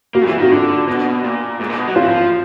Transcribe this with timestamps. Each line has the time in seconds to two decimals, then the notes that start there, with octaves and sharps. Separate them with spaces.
0.15 A#3 F#4
0.27 E3 F4
0.39 D#3 F#4
0.51 D3
0.88 B2
1.24 A#2
1.60 G#2
1.69 A#2
1.78 B2
1.88 F#3
1.95 F3 F4
2.02 E3
2.09 F3